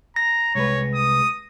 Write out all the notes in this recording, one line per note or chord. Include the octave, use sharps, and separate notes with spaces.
A#5 A#6
C2 G#3 B4 C#5
D#6